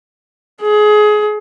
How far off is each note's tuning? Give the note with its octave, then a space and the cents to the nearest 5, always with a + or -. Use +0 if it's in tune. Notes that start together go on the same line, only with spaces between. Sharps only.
G#4 +25